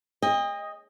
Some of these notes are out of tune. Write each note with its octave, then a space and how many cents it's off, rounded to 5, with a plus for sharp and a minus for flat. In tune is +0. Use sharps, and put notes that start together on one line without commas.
D#5 +0 G5 +45